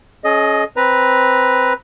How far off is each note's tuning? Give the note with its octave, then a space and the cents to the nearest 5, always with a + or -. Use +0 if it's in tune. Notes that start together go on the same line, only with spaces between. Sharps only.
C#4 +0 G#4 +40 D#5 +0
C4 +0 B4 +0 A#5 +0